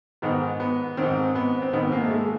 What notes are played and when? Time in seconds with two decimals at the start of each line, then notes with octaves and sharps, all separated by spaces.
0.22 G#2 D#3 B3
0.60 B3
0.97 G#2 D#3 C4
1.35 B3
1.62 C4
1.73 G#2 D#3 B3
1.92 A#3
2.04 A3
2.11 G#3